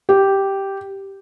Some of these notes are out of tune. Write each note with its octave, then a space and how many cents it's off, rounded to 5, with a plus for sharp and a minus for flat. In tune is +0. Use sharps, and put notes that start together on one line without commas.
G4 -5